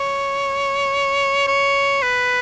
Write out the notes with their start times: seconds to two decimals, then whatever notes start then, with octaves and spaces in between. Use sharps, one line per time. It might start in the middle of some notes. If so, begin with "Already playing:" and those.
Already playing: C#5
1.48 C#5
2.02 B4